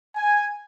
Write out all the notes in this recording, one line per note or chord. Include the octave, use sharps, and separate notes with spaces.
G#5